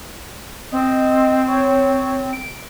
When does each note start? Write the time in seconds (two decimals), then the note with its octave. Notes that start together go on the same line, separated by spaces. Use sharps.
0.72 C4 D#5
1.48 C#5
2.33 D7